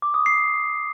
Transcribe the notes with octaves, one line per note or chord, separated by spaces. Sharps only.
D6
D#6
C7